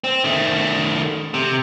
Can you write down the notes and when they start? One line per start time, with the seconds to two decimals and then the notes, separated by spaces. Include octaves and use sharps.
0.04 C4
0.24 D#3 A3
1.34 C3